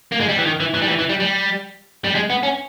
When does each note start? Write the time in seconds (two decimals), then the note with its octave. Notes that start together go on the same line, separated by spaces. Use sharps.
0.12 A#3
0.20 G#3
0.29 G3
0.37 E3
0.46 D#3
0.60 E3
0.74 E3
0.82 G3
0.88 E3
0.99 E3
1.09 G3
1.20 G3
2.04 G3
2.15 G#3
2.30 B3
2.43 C#4